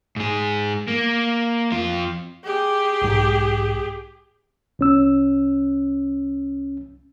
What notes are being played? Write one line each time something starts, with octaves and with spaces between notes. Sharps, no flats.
G#2 G#4
A#3
F2 F4
G4 G#4
B1 G#2
C2 C#4 E6